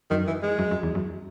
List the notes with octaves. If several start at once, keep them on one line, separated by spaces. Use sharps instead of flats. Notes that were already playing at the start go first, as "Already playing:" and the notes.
F#2 D#3
E3
G#3
F#2
F#2
E2
F#2